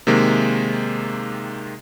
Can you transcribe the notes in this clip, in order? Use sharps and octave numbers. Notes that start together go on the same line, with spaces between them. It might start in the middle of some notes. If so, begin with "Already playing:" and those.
C3 D#3 G#3 A#3